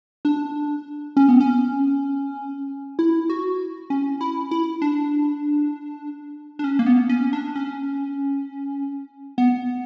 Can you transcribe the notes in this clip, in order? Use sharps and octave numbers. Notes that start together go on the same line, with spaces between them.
D4
C#4
B3
C#4
E4
F#4
C#4
E4
E4
D4
D4
C#4
A#3
B3
C#4
D4
C#4
B3